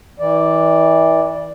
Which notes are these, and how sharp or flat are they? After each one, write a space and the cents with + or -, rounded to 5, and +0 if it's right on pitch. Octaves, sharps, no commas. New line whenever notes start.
E3 -30 D5 +0